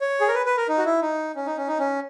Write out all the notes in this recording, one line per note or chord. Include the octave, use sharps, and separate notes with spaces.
C#5
G#4
A#4
B4
B4
A#4
D#4
F#4
E4
D#4
C#4
D#4
C#4
D#4
C#4